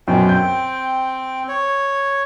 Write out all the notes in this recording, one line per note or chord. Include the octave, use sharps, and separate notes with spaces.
F#2 B2 C4 G5
G6
C#5